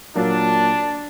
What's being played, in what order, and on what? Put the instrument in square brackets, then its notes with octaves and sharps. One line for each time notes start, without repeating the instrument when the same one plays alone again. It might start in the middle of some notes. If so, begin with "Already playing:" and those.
[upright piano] A#2 F#3 A#3 [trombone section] D4